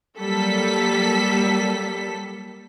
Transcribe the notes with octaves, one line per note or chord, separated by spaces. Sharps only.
F#3 G3 A#3 A4 B6